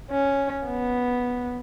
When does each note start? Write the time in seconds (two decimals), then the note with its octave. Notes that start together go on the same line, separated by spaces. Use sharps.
0.11 C#4
0.67 B3